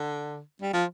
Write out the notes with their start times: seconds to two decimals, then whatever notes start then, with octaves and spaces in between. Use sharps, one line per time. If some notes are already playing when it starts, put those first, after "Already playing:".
Already playing: D3
0.62 G3
0.73 F3